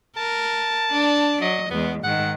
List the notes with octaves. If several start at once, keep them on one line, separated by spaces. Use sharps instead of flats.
A#4 A5
D4 D5
F#3 D#5
E2 G#3 B3
G#2 D#3 F#5